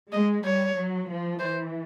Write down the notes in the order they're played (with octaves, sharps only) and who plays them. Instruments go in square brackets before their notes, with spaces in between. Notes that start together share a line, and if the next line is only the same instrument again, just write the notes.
[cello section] G#3 [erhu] D#5
[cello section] G3 [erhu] C#5
[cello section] F#3
F3
[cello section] E3 [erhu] C5